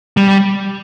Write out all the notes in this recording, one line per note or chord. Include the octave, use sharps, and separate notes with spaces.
G3